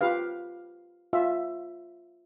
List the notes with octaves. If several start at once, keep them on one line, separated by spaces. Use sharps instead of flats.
F4 G4 B4 F5
F4 E5